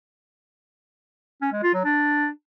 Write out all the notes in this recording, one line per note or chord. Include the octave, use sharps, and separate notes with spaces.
C#4
G#3
F4
F#3
D4